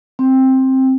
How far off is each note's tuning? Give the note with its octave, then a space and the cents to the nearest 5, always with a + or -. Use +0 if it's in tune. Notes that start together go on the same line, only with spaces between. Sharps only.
C4 +10